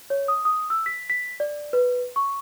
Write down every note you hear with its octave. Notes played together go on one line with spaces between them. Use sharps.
C#5
D#6
D#6
E6
B6
B6
D5
B4
C#6